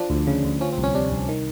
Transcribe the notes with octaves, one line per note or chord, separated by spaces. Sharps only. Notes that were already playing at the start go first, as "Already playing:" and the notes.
Already playing: F3 D4
D2
C#3
D2
F3 C#4
C4
C2
C#4
C3 D4
C2
D#3